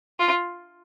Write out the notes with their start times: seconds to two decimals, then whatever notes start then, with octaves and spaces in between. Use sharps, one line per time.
0.19 F4